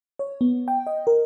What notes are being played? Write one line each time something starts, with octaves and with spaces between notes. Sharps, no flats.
C#5
B3
G5
D#5
A#4